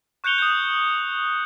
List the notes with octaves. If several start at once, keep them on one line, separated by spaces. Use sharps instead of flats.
C#6 F#6 G6 C#7 F7 G7
D#6 G6